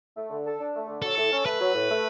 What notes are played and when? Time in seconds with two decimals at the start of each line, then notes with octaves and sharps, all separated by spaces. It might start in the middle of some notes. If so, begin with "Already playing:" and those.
0.16 A3
0.30 D3
0.45 A4
0.60 D4
0.74 A3
0.88 D3
1.02 F#3 A4
1.17 A2
1.32 C#4
1.45 A3 B4
1.60 F#3
1.74 A2
1.89 A3